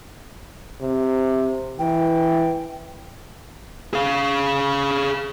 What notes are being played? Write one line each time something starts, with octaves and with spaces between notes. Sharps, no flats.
C3
E3 G5
G#4 F5